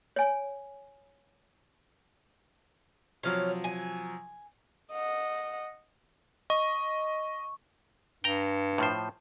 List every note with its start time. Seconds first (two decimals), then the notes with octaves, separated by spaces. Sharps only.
0.16 C#5 G#5
3.23 C3 F3 F#3 C#4 F5
3.64 G#5
4.92 D#5 F#5
6.50 D#5 C#6
8.24 G2 G5 A#5
8.78 A2 F3 C5